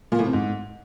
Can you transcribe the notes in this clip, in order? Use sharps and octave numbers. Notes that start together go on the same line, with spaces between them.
A#2
A2
C3
G#2